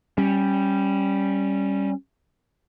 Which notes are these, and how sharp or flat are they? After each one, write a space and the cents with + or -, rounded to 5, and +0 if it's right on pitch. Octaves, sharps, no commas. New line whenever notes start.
G3 +0 C#4 -10